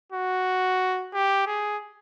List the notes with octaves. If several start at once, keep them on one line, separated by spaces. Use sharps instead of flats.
F#4
G4
G#4